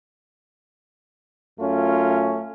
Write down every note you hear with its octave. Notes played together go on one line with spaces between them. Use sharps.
F#2 A3 C#4 F4